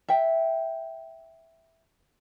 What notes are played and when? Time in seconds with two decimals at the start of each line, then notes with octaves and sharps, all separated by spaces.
0.08 E5 G5